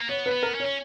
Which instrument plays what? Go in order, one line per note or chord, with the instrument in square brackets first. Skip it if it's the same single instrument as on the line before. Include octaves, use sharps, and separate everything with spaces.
[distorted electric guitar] A#3
[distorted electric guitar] B3 [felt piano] C#5
[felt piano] B4
[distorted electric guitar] B3
[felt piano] A#4
[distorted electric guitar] C#4
[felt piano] C#5
[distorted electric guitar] C#4